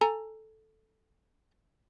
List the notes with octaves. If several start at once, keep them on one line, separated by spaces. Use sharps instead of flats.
A4 G#5 A#5